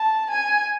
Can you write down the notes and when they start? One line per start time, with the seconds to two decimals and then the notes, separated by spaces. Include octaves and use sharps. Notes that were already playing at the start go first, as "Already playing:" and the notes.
Already playing: A5
0.31 G#5